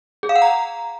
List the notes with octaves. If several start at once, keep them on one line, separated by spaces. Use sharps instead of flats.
G#4
F5
F#5
A#5